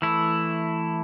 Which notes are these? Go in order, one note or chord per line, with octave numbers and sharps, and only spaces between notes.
E3 A3 E4